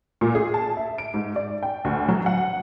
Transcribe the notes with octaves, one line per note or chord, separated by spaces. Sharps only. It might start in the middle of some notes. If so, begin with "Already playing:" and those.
A#2
G#4
A5
E5
D7
G#2
D5
G5
D2
F#3
F#5